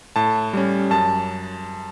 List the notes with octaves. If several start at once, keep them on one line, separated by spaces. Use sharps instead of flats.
A2 A5
G3 C#4
F#2 A5